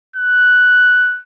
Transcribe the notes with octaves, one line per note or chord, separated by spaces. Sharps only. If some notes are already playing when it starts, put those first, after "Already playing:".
F#6